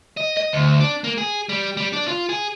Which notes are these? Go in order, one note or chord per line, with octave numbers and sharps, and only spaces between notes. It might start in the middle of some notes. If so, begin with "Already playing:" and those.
D#5
D#5
D2
D4
A#3
G#4
G3
G3
D4
F4
G#4